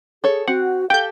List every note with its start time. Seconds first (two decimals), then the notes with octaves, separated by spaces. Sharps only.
0.24 G#4 A4 C#5
0.48 C4 F#4 F#5
0.90 G4 A4 F5 G5 G6